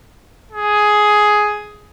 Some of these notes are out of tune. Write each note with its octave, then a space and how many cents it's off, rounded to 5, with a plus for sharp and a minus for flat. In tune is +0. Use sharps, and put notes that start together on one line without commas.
G#4 +10